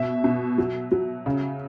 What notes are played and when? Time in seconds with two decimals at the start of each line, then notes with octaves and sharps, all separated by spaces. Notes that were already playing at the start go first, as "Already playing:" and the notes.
Already playing: B2 E5
0.24 B2
0.58 F#3
0.91 F#3
1.26 C#3